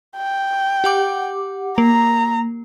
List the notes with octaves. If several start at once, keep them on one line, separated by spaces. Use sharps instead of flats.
G5
G4 F#5 D6
A#3 A#5